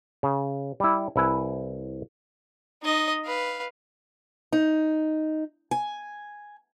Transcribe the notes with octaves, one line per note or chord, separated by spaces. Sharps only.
C#3
G3 E4
C2 E4 B4 G#5
D#4 D#5
B4 F5
D#4
G#5